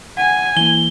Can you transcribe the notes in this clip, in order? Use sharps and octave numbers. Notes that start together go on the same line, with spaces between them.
F#5 G#5
E3 A#3 E4 G7